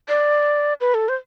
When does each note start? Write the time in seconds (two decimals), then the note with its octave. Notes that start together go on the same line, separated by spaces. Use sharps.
0.09 D5
0.81 B4
0.94 A4
1.09 C5